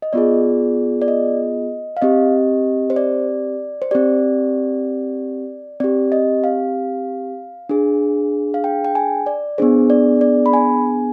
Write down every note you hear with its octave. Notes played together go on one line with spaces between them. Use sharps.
D#5
B3 F4 G#4 D5
D5
D#5
F5
C4 G4 D#5
C5
D5
C5
C4 G4 D5
C4 G4 D5
D#5
F5
D4 G#4
F5
G5
G5
G#5
D5
B3 D4 G#4 C5
D5
D5
B5
G#5